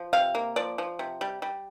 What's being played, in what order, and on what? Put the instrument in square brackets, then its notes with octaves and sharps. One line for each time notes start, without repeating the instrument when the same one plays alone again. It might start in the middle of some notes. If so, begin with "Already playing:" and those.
Already playing: [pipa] F3
C3 F5
A#3
F3 D5
F3
C3
G3
G3